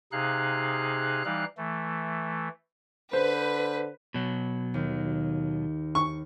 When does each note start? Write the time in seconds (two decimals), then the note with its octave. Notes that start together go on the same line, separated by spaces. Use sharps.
0.12 C3 D#4 G#4 F5 F#6
1.25 E3 G3 D#4 F5 F#6
1.57 E3 A3
3.13 D3 B4 C5
4.14 B2 F#3
4.74 D#2
5.95 C#6